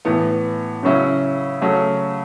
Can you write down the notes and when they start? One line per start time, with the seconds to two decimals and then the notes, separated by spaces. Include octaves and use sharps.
0.05 A2 E3 B3
0.83 C#3 F#3 C#4 E4
1.61 C#3 F#3 A3 C#4